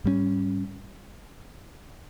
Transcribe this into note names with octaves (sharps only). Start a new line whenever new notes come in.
G#2 G3 A#3 C#4